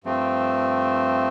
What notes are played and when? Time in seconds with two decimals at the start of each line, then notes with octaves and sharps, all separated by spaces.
0.04 G2 F3 A3 C4